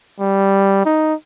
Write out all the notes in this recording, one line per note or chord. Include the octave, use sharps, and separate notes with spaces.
G3
D#4